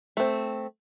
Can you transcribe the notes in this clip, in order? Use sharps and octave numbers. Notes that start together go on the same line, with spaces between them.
A3 C4